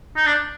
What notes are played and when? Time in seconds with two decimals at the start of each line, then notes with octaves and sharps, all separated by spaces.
0.16 D#4
0.26 D4